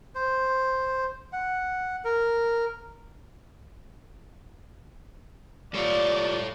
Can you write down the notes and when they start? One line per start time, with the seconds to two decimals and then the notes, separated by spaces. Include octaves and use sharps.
0.15 C5
1.33 F#5
2.05 A#4
5.74 G3 F4 A4 C#5 D5